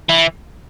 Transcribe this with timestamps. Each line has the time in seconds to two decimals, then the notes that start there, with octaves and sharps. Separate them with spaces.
0.09 E3